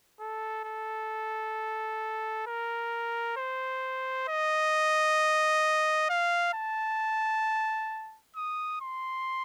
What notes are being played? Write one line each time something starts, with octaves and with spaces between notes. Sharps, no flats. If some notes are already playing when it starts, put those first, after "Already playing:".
A4
A4
A#4
C5
D#5
F5
A5
D#6
C6